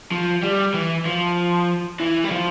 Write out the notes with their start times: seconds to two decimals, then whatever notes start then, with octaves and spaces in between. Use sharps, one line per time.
0.11 F3
0.43 G3
0.74 E3
1.06 F3
2.00 E3
2.24 G3
2.31 F3